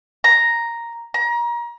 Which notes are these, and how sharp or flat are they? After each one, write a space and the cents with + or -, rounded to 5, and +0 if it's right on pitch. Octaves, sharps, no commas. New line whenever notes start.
A#5 +0
A#5 +30